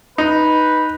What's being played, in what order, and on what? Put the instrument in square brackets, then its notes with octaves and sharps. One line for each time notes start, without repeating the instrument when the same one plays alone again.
[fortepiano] D#4 [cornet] B4